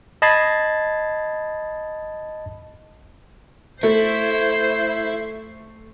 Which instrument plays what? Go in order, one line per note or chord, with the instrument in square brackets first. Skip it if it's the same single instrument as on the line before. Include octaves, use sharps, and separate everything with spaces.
[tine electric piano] D#5 A5 B5 G#6 A6 C7
[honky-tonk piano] A3 [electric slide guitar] E4 [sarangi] C5